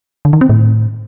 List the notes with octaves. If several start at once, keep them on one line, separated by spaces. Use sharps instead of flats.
D3
D#3
C4
A2